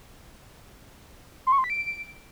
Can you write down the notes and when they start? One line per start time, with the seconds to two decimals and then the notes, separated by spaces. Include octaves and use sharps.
1.47 C6
1.52 C#6
1.58 C6
1.64 B6
1.70 D7